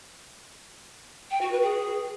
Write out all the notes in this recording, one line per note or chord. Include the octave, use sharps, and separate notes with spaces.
G5
F#4
B4
G#4